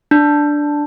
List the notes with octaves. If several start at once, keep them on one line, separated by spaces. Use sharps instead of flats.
D4